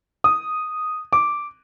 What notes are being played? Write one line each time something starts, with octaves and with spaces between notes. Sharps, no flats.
D#6
D6